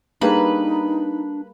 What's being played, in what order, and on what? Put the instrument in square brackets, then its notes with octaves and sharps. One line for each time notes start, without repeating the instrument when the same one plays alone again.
[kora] G3 A#3 G#4 [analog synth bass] D4 [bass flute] D#4 [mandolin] B4